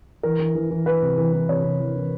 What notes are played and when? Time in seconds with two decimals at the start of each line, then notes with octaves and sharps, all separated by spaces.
0.23 E3 A#4
0.40 E3
0.55 E3
0.71 E3
0.86 E3 B4
1.02 C3
1.18 E3
1.33 E3
1.49 C3 C#5
1.64 C3
1.80 E3
1.96 E3